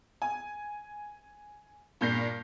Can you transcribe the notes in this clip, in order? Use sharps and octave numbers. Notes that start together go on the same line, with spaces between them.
G#5
G2 A#2 G6 A#6 C7